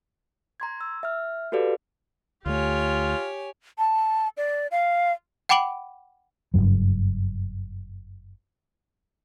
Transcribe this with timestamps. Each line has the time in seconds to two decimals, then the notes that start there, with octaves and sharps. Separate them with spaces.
0.60 A#5 C6 G#6
0.81 E6
1.03 E5 F6
1.52 F#4 G4 A4 B4 D5 F5
2.46 D2 A3 F4 G4 C#5 G#5
3.78 A5
4.37 D5
4.71 F5
5.49 F#5 G5 B5 D6 D7 F#7
6.54 F#1 B1 G2 F#3